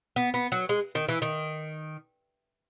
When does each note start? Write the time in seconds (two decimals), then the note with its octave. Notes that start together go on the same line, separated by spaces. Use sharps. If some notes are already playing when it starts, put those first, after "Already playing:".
0.16 B3
0.34 B3
0.52 F#3
0.69 G#3
0.95 D#3
1.09 E3
1.22 D#3